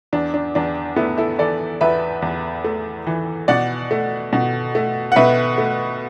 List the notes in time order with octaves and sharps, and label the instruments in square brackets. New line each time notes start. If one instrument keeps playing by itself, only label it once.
[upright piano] E2 D4
D4
E2 D4
A3 B3 E4
E4 A4
E3 A4 D5
E2 B4 E5
E2
A3
E3
B2 D5 F#5
A3
B2
A3
F#5
B2 B4 E5
A3